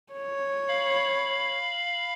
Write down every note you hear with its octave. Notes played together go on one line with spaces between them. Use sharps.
C#5
F5 B5